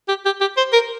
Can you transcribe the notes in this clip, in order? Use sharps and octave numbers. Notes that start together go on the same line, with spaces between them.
G4
G4
G4
C5
A#4